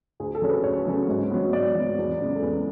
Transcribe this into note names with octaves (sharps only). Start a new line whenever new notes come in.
D2 G#4
A4
C#3 F#3 A3 C#4
B4
D2 C#5
C#3 F#3 A3 C#4
G#2
F#3 B3
G#2 D5
F#3 B3
E2
C#3 G#3 B3
A4
E2 B4